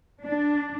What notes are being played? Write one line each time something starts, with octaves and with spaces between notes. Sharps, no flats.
D4